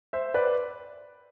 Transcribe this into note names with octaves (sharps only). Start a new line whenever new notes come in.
C5 E5
B4 D5